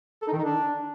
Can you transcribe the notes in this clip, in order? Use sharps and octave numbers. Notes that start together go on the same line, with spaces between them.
A4
D#4
D#3
D#4
D4